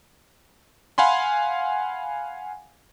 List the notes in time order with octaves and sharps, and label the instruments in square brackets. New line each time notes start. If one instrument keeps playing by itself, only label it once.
[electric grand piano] F5 F#5 G#5 B5 C6